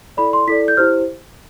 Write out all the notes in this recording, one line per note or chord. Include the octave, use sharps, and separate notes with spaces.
E4 A4 D5 B5
C6
E4 A4 D5 B6
G6
E4 G4 C5 F6